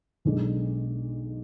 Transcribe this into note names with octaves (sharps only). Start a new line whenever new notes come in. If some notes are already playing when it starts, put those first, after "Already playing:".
B1 B2 G#3 D4 A4